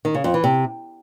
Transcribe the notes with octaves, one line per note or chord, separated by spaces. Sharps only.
D#3
C#3
F2
E3
C3